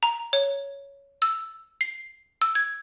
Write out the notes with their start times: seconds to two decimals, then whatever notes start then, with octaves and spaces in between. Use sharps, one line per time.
0.03 A#5
0.33 C#5
1.22 E6
1.81 C7
2.42 E6
2.55 G#6